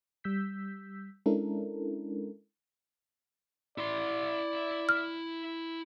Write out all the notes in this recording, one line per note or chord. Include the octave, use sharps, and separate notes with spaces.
G3 E6 G6 B6
G#3 C#4 D4 E4 A4 A#4
E4 D5 C6
F6